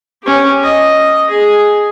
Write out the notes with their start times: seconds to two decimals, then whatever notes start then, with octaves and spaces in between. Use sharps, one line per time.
0.23 C#4 G4
0.63 D#5
1.30 G#4